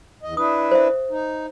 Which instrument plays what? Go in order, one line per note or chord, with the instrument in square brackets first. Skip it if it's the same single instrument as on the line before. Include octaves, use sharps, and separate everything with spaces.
[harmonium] E2 D#5
[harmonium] D4 E4 B4 [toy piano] D#6
[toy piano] C5 E5
[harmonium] D#4